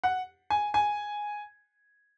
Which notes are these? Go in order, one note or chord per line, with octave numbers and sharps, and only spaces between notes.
F#5
G#5
G#5